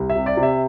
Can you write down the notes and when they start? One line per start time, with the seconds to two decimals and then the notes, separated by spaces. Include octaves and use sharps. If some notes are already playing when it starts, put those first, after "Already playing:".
Already playing: C2
0.10 E5
0.16 C3
0.26 D5
0.37 C3
0.43 E5